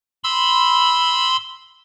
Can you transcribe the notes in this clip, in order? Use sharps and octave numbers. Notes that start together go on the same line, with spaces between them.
B5 C6 E6